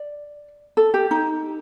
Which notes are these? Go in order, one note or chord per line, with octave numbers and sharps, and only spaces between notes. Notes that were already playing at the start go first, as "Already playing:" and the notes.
Already playing: D5
A4
G4
D#4